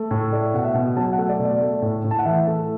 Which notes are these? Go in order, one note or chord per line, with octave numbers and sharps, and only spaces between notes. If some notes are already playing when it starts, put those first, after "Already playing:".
Already playing: A3
A2
A3 D5
B2 F#5
E5
B2
F#3 A5
F#5
A3
D5
B2
D5
A3
A2
A2
A5
F#5
E3 E5
A3